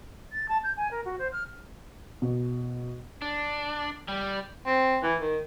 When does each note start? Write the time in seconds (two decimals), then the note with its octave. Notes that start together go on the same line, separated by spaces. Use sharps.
0.32 A6
0.49 A5
0.63 G6
0.77 G#5
0.91 A#4
1.05 F#4
1.18 C5
1.32 F6
2.22 B2
3.22 D4
4.08 G3
4.66 C4
5.03 E3
5.21 D#3